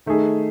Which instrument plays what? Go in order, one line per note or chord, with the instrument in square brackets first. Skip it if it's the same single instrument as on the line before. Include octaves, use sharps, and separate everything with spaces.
[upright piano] D#3 A3 D#4 G#4